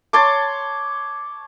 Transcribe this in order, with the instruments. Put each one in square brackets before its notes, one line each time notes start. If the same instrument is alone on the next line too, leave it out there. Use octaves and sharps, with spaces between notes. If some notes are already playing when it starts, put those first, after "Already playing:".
[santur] C#5 A5 C6 D6